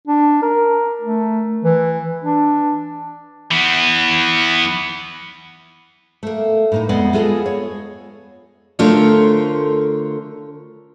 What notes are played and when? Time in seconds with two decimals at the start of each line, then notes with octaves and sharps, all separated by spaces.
0.08 D4
0.42 A#4
1.01 A3
1.64 E3
2.24 D4
3.51 E3 B3
6.23 A3 A#3
6.72 A2 A#3 D#4
6.89 F2 G#3 B3 D5 D#5 F#5
7.13 G#3 B3 F4 G#4 A4 D#5
7.46 C#5
8.79 D3 A3 F4 A#4 C5 C#5